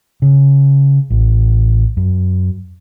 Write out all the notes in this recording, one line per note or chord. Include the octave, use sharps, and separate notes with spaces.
C#3
A1
F#2